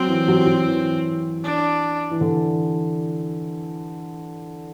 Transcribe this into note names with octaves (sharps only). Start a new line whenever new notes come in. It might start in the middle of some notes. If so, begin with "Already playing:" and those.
Already playing: F#3 C4
E3
F#3
F#3
E3
D4
E3
D3